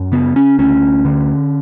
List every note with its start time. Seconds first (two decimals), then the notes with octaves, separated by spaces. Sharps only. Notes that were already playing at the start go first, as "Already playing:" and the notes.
Already playing: F#2
0.12 C#3 B3
0.36 C#4
0.59 D2 C#4
1.05 D3